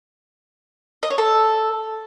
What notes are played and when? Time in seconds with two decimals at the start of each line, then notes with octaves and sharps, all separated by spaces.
1.03 D#5
1.10 C#5
1.18 A4